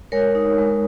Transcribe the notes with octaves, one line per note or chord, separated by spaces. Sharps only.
G#3 A#4 C#5
D#4
G#3